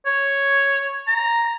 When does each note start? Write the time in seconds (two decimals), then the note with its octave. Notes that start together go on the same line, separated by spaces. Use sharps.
0.06 C#5
1.08 A#5